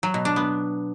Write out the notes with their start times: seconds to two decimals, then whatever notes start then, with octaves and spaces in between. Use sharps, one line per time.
0.03 F#3
0.14 B2
0.25 D4
0.36 B3